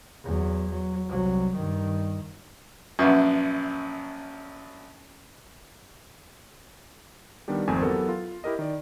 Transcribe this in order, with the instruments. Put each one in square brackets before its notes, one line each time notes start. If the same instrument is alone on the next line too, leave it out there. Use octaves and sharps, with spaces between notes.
[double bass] E2 F#3
F#3
C2 F#3
G2 D#3
[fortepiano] A#1 F#2 [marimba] C#4 B4 E5
[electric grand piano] D#3 G3 B3 D4 G4
G#1 F2 A3 C4 G#5
E3 F#3 B3 G4 A4 A#4
F4
E4 G4 A#4 D#5
D#3 D5